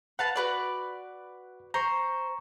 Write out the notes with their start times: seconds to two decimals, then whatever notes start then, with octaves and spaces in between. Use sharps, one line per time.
0.19 B4 F5 F#5 A5
0.36 F#4 B4 D5
1.74 C5 A#5 C#6